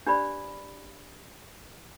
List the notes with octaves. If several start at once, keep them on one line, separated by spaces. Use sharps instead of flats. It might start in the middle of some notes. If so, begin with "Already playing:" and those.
D4 G4 B4 C5 D5 B5